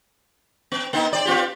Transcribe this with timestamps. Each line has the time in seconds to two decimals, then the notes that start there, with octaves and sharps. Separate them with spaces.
0.72 B3
0.93 A#3 C4 D#4
1.13 C4 D5
1.25 B3 F4 G4